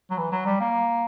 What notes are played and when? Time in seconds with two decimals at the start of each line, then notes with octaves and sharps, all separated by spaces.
0.10 F#3
0.18 E3
0.32 F#3
0.46 G3
0.60 A#3